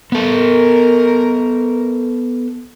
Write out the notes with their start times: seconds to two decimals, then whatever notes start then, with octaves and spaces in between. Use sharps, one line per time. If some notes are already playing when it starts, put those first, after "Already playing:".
0.12 B3 A4 A#4